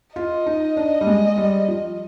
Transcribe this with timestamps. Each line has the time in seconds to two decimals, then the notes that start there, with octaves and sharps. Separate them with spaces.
0.16 F4 D#5
0.46 D#4
0.77 D4
1.01 G3
1.07 G#3
1.38 G3
1.68 F3